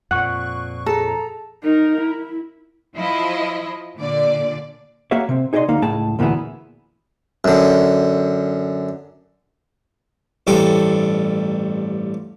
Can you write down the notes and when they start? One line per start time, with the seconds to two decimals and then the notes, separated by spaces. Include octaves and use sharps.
0.11 F2 A#2 F#5 C#6 F#6
0.86 G#4 A4 A#5
1.63 D#4 A#4
2.01 E4
2.96 F3 E4 D#5
3.99 A#2 D3 D5
5.11 A#3 F#4 G#4 C#5 E5 F5
5.29 C3 C4
5.53 D#4 G#4 C5 D5 D#5 C6
5.68 D2 A#3 D#4 F5
5.82 C#2 A2 A3 G#4 G5 A5
6.19 D2 A#2 E3 B3 E4 G#4
7.44 F#2 D3
10.47 A1 G2 C3 A4 G5